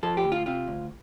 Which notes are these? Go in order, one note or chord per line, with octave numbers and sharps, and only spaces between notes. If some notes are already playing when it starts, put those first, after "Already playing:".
F3 A4
G4
D2
F4
C3 F4
D2